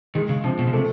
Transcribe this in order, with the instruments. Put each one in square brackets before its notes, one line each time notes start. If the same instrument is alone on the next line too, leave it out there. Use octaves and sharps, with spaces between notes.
[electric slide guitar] D#3 [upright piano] G#3
[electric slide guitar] C#3
[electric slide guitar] C3 [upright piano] F3
[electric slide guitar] B2
C#3
[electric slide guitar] C3 [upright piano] A3